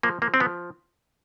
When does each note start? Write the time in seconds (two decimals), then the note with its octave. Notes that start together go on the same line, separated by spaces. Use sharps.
0.03 F3 A#3
0.22 F3 A#3
0.34 C4
0.40 F3 B3